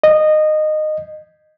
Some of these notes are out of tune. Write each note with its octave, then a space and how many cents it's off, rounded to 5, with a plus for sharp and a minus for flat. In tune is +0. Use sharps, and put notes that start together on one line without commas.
D#5 -15